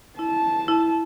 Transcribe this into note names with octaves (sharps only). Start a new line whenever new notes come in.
E4 A5
E4